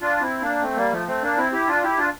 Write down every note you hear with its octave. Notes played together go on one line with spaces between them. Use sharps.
D4 F4
C4 E4
A#3 D4
A3 C4
G3 A#3
F3 A3
A3 C4
A#3 D4
C4 E4
E4 G4
D4 F4
E4 G4
D4 F4